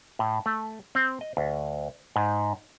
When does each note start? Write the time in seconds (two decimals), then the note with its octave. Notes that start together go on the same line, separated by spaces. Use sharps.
0.19 A2
0.46 A3
0.95 C4
1.21 D#5
1.37 D2
2.16 G#2